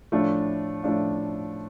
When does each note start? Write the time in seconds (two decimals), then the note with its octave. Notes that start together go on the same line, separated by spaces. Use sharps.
0.12 A2 F3 A3 D4 F4
0.83 A2 F3 A3 D4 F4